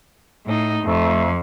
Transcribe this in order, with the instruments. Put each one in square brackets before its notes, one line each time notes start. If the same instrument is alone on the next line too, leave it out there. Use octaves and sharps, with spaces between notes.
[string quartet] A2 D#4
[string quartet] F2 [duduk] A3